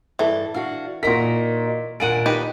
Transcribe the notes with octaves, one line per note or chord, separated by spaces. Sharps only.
G2 E3 A4
D4 F#4 F5
A#2 D#4 F#4 A#4 A#5 B6
D#2 A#2 D4 A#4 F#5 G#5 D7 D#7
D#4 G4 B4